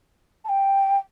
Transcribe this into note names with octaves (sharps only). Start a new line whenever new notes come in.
A5
G5